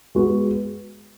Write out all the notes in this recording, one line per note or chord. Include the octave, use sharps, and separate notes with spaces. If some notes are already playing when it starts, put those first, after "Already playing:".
G#3 B3 F#4